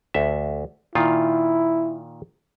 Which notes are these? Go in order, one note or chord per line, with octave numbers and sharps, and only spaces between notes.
D2 E5
A#2 D#3 E4 F4